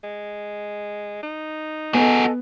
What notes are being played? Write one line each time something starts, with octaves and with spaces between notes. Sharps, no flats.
G#3
D#4
B3 F#4 G#4 A4 D#5 G#5